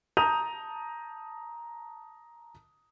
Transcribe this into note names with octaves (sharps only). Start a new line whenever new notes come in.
A5 A#5 D#6 G6 D#7 F7